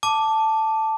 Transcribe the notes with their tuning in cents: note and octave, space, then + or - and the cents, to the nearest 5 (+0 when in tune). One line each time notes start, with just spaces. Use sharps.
A5 +0 D6 +0